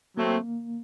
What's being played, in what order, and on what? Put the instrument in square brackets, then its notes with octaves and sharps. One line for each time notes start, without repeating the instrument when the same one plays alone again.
[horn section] F#3 A3 C4 [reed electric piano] A#3